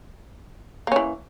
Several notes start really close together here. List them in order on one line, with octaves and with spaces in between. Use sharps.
A#3 C#4 E3